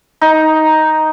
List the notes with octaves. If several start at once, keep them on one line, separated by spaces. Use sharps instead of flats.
D#4